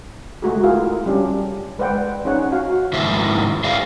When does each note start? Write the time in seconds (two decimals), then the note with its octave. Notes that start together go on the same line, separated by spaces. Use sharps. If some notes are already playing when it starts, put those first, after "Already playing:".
0.42 G#3 A3 F#4 G#4
0.63 E4 F4 G#4 A#4 F5
1.06 G3 C#4 D4 G4
1.79 G#3 B4 C5 D5 F#5 G5
2.25 C#4 D#4 G#4 C#5 F#5
2.52 F#4 F5
2.93 G#2 D#3 E4 C5 E5
3.64 G#4 C5 D5 E5 F5